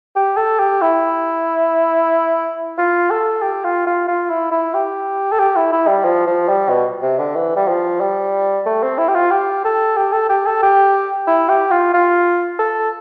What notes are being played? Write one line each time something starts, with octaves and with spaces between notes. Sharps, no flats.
G4
A4
G4
E4
F4
A4
G4
F4
F4
F4
E4
E4
G4
A4
G4
E4
E4
G3
F3
F3
G3
B2
C3
D3
E3
G3
F3
G3
A3
C4
E4
G4
F4
G4
A4
G4
A4
G4
A4
G4
E4
G4
F4
F4
A4